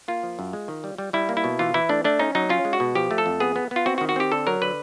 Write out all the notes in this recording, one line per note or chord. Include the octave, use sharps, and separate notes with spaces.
A#3 F4
F3
F#2
G#3
D#3
G3
G3
G3 E4
A#3
E4
B2
E3 F4
E3 E4
A3 D4
A3 D4
C#4 D#4
F#3 D#4
C#4 F4
G#3
F#4
B2
F3 G4
A3
A4
F2
B3 G#4
B3
B3 F4
C4 F#4
F#4
D#3
F#4
C4 G4
D3 A4
F#3 A#4
D3 B4